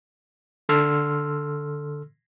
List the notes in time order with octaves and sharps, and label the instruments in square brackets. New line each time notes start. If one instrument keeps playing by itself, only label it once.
[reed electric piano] D3 A4 C6 E6 F6